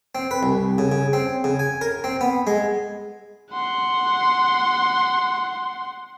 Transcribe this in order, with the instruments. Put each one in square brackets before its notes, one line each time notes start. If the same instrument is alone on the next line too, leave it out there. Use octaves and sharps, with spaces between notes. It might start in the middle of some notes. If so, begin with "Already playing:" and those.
[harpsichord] C4
B4
C2
C#3
C#3
C4
C#3
G#5
A#4
C4
B3
G#3
[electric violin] F#5 C6